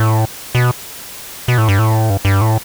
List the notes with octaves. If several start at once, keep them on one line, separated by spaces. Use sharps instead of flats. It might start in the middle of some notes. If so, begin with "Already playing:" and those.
Already playing: A2
B2
B2
A2
G2
A2
G2
G2
A2